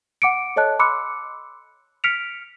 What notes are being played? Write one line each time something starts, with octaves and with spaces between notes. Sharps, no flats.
F#5 D6 C#7 D7
A4 C#5 D#5 A5 F#6
B5 C6 D6 E6 F#6 C#7
F6 B6 C#7 D7 F7